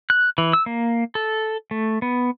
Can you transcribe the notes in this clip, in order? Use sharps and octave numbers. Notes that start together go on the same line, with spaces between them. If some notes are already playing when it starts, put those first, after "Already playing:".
F#6
E3
E6
A#3
A4
A3
B3